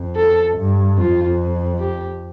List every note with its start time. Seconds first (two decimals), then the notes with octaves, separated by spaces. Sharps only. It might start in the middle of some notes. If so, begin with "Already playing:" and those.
Already playing: F2
0.16 A4
0.57 G2
0.98 F2 F4
1.80 G4